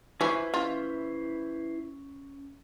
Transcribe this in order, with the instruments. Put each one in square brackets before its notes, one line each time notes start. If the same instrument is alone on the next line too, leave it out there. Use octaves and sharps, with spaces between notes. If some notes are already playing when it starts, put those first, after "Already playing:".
[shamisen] E3 C#4 [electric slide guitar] E4 B4 C5
[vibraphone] C#4 [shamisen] F4